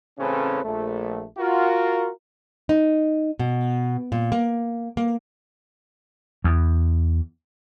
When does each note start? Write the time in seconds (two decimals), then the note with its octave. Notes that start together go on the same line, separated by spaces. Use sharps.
0.19 A1 C#3 C4 C#4 A4 B4
0.63 A#1 A3
1.38 F4 F#4 A#4
2.69 D#4
3.39 B2
4.12 A#2
4.32 A#3
4.97 A#3
6.44 E2